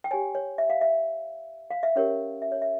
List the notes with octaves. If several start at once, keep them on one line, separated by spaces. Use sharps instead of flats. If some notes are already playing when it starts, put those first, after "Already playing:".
G5
G4 C#5 G#5
C#5
E5
F5
E5
F5
E5
C#4 G4 A#4 C#5
E5
C#5
E5